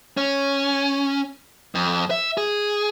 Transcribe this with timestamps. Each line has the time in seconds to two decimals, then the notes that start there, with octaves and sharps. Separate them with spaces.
0.17 C#4
1.75 F2
2.11 E5
2.38 G#4